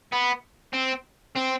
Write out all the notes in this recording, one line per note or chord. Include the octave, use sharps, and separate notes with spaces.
B3
C4
C4